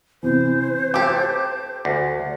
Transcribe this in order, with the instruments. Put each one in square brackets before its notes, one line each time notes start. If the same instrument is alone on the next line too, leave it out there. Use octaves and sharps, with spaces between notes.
[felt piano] C3 E3 [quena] C5
[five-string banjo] G4 A4 [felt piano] D6
[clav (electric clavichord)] D2